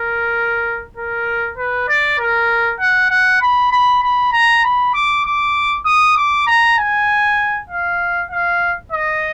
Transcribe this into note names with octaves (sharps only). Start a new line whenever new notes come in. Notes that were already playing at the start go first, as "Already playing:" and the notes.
Already playing: A#4
A#4
B4
D5
A#4
F#5
F#5
B5
B5
B5
A#5
B5
D6
D6
D#6
D6
A#5
G#5
F5
F5
D#5